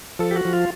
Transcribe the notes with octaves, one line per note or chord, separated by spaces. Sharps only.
F3 A4
G4
F#4
F3
F4